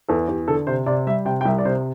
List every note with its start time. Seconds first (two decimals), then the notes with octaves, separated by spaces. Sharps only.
0.08 E2 A4
0.28 E2 G4
0.48 D3 A4
0.67 C3 C5
0.86 C3 D5
1.07 G3 E5
1.25 C3 G5
1.41 G5
1.45 C2 E5
1.58 D5
1.65 C3 C5